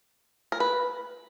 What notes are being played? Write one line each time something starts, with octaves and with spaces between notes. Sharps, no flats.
A#4
B4